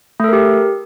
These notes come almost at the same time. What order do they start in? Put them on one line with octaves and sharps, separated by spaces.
A3 A4 A#4 G4